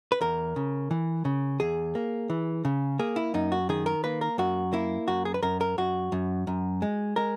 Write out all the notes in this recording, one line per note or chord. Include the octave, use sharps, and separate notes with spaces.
B4
E2 A#4
C#3
E3
C#3
E2 G#4
A#3
E3
C#3
A#3 G#4
E4
F#2 D#4
F#4
D#3 G#4
A#4
A#3 B4
A#4
F#2 F#4
A#3 E4
F#2 F#4
G#4
B4
F#2 A#4
A#4
F#2 F#4
F#2
F#2
G#3
G#3 A#4